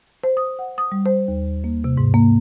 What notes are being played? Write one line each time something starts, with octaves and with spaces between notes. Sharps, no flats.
C5
D#6
F#5
D#6
G3
C5
D#2
A#3
C3
G#2
A#3